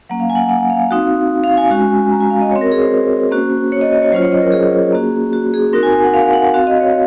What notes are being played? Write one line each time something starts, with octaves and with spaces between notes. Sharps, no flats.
F#3 A#3 C#4 F#5
F5
G#5
F#5
G#5
F#5
F5
C4 D#4 F#4
F5
G#5
G#3 C#4 F#4
A#5
G#5
F5
D#5
C4 F#4 C#5
A#4
G#4
C5
A#3 C#4 F#4
C#5
D#5
D#5
C#5
F#3 C#4 F4 C5
C#5
D#5
A#4
G#4
A#3 C#4 F#4
F#4
G#4
C4 D#4 F#4 A#4
G#5
G#5
F#5
F5
F#5
C4 F#4 F5
D#5
C#5